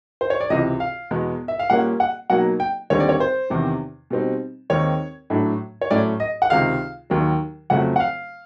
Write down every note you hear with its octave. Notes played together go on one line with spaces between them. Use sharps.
C5
C#5
D5
C#2 C3 E3 D#5
F5
E2 B2 G#3 B3
E5
F5
A#2 G3 A#3 C#4 F#5
F#5
B2 F#3 A#3 D#4 F#5
G5
D#2 D3 G3 C4 D#4 C#5
D5
C#5
C5
E2 C3 D#3
B2 G3 C4 D#4
D#2 D#3 G#3 C4 D#4 C#5
A2 F#3 A3 D4
C#5
A2 F#3 A3 C#4 D5
D#5
F#5
C#2 C3 D#3 G#3 F5
D#2 D#3 F#3
F2 C#3 F#3 A3 F#5
F#5
F5